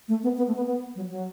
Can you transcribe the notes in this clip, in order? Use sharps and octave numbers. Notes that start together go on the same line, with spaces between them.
A3
B3
B3
A3
B3
B3
F#3
F#3